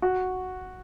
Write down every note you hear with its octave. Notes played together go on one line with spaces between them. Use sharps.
F#4